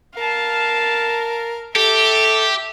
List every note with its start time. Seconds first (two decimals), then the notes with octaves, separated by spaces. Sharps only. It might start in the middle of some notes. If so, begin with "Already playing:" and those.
0.17 A#4 F5 A5
1.76 G4 A4 E5